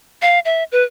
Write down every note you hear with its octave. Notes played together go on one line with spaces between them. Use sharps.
F5
E5
B4